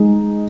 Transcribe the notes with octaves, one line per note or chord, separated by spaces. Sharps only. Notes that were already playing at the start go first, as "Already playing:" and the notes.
Already playing: G#3 D#4